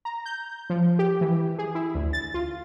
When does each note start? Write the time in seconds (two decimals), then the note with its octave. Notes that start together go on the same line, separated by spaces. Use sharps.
0.05 A#5
0.26 G6
0.70 F3
0.99 G4
1.21 E3
1.59 G#4
1.75 E4
1.95 D2
2.13 A6
2.34 F4